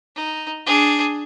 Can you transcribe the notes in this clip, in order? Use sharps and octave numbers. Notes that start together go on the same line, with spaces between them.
D#4
D4 G#4